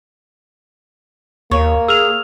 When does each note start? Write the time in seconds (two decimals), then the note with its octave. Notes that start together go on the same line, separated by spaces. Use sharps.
1.51 D#2 A#3 C#5
1.88 G#4 E6 F6 F7